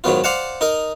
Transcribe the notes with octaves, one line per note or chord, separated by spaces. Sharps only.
G#2 D#3 F#3 B3 F4
C5 D5 F5 F#5 A5
D#4 A#4 D#5